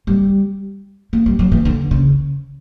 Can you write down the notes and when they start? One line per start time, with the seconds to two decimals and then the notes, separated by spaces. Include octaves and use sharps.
0.07 G3
1.13 A#3
1.26 G3
1.39 F#3
1.52 E3
1.65 D3
1.91 C#3